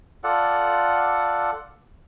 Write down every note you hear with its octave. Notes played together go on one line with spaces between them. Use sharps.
F4 A4 D5 F#5